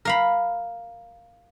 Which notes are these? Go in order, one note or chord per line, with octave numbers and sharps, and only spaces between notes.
A#4 F5 B5